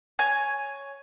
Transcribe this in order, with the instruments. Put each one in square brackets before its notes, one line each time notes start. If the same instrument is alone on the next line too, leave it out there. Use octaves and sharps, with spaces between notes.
[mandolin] C#5 G#5